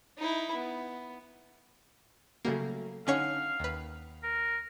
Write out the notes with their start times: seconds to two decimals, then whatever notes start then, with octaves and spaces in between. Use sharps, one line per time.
0.18 D#4 E4
0.55 B3
2.45 C#3 F#3 G3 A3 A#3
3.07 D3 C#4 D#4 C#5 F5 F#5
3.60 D#2 B4
4.23 A#4